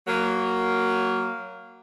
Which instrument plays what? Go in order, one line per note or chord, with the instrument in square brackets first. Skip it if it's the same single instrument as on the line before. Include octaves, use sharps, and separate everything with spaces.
[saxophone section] F#3 A#3